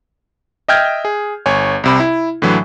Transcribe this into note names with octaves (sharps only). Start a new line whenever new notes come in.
D#5 E5 G5 F6 G6 G#6
G#4
G1 C#5 G#5
C2 C3 B5
E4
A2 D3 E3 F#3